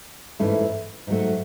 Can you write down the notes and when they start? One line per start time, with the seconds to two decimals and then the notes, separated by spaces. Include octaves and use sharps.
0.39 G#2 E3 A3 C#4 E4
1.07 G#2 F#3 A3